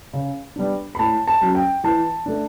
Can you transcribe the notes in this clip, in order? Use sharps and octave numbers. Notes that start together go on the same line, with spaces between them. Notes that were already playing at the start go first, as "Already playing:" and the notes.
C#3
G3 B3 D4
B5
A2 A5
A5
F#3 C#4
G5
E3 A5
A3 D4